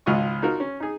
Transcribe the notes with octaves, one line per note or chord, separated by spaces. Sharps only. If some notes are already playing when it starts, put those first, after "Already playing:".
G#1 C#2 F4 D#5 C#6
D#4 F4 F#4 A#4
C#4
D#4 G#4